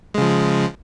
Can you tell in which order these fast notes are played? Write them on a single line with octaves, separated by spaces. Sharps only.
G#3 C#3 F3